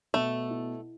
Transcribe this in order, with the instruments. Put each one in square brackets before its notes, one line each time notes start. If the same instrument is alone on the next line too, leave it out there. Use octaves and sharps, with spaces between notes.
[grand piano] B2 [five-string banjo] A3
[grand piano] E4